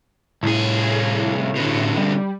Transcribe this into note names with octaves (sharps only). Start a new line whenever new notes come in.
C2 A2 G#4
B2 D3
G3